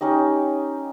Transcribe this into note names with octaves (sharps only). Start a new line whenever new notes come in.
C#4 D#4 G4 D#5